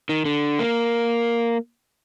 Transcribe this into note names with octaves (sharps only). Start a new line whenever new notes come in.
D#3
D3
A#3